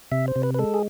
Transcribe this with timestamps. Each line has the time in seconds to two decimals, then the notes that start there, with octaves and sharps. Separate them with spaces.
0.12 C3 E5
0.28 C5
0.36 C3
0.43 B4
0.54 B4
0.59 G#3 A4
0.74 G#4